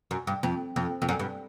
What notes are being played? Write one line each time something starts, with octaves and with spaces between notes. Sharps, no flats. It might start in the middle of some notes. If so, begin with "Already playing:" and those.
F#2
G2
F2
F2
F2
F#2
G2